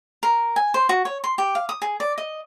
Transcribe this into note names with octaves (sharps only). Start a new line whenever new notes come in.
A#4
G#5
C5
F#4
C#5
C6
G4
F5
D#6
G#4
D5
D#5